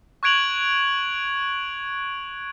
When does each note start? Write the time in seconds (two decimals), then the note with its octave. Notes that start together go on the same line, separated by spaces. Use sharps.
0.23 C#6 F#6 G#6 D7 F7 F#7